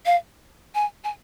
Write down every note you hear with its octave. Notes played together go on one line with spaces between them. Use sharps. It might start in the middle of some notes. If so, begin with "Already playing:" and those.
F5
G#5
G#5